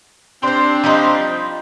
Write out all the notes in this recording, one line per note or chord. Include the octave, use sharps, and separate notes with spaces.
C4 D4 G4 C5 C6
F3 G3 D#4